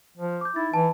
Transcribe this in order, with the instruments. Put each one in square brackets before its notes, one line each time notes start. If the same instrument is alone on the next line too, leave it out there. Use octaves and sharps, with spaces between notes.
[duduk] F3
[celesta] D6 G6
[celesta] D#4 A6 [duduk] E4
[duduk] E3 [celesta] A5